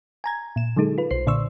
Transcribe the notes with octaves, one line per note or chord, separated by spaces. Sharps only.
G#5 A#5 G#6
A#2 E7
D3 F#3 G#3 D#4 G#4 A4
F4 B4
B1 C5 C7
A#2 D3 D5 C6 C#6 E6